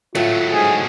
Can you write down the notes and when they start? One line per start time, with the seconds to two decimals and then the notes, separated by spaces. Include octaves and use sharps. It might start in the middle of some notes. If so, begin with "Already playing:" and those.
0.15 A2 F#3 A3 F4
0.53 G#2 G#4